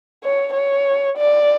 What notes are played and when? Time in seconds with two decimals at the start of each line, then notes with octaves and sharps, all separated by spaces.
0.23 C#5
0.54 C#5
1.17 D5